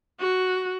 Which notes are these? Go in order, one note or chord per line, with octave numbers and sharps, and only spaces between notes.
F#4